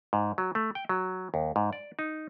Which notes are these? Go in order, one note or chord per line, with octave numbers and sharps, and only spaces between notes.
G#2
F#3
A3
G5
F#3
D#2
G#2
D5
D#4